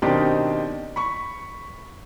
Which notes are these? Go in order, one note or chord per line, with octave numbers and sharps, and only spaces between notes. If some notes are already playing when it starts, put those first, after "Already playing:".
B2 D#3 C4 D4 D#4 G4
B5 C#6